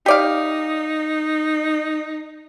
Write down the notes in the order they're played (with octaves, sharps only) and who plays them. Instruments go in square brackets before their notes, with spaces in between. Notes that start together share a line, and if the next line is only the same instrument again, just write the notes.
[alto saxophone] D#4 [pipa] G4 D5 F5